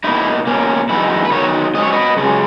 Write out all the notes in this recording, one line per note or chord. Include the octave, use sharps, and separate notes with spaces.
B2 A#3 D#4 E4
B2 A#3 C#4
F#2 E3 G#3 B3 D#4 E4
B4
D#3 F#3 B3 D#4 A#4 C#5
G#2 F#3 C#4 D#5
C#5
B4 D#5
F#2 C#3 G#3 C#4